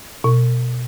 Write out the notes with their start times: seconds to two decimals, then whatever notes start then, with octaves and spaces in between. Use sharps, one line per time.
0.24 B2